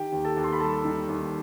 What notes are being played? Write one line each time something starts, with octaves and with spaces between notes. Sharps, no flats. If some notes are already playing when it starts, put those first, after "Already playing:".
Already playing: D#3 G4 G5
D#2
A4 A5
D#2
C6
B5
G3 A4 A5
D#3
D#2